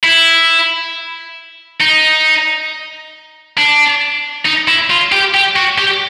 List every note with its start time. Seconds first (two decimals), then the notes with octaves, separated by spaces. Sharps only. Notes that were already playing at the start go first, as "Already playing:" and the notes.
0.04 E4
1.80 D#4
3.58 D4
4.46 D#4
4.68 E4
4.90 F4
5.12 G4
5.35 G4
5.56 F#4
5.79 G4